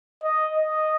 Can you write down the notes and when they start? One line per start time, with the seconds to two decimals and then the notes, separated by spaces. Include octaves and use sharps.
0.23 D#5
0.56 D#5